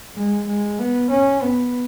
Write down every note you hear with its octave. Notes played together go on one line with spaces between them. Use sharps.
G#3
G#3
B3
C#4
B3